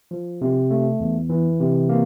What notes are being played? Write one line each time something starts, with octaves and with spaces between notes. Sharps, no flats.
F3
C3
A3
E2
E3
C3
A#3